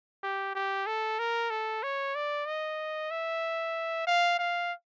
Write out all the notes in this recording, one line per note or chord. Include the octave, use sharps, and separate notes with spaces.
G4
G4
A4
A#4
A4
C#5
D5
D#5
E5
F5
F5